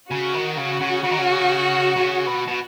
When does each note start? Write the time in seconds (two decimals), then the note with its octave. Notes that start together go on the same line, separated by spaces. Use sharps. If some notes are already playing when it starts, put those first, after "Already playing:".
0.11 C#3 F#4
0.34 D#3
0.57 C#3 F#4
0.80 C#3
1.04 C#3
1.11 D#3
1.18 C#3
1.96 C#3
2.27 B2
2.47 B2